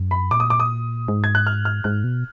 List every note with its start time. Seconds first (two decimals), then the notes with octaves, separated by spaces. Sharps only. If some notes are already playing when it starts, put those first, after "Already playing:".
Already playing: F#2
0.11 B5
0.31 A#2 D6
0.40 D#6
0.50 D6
0.60 D#6
1.08 G#2
1.24 G#6
1.35 F#6
1.47 F6
1.65 F6
1.84 G#2 F#6
2.04 B2